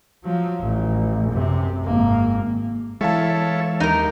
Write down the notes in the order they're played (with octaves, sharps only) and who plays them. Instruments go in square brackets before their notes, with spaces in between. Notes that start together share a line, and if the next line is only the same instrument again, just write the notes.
[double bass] F3 F#3
A1
F#2 C3
G#1 A#3
[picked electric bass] E3 G#3 [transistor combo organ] E4 A4 C#5 [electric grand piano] E5 F5 A5
[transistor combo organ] D#2 G4 [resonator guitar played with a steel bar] D#4 A#4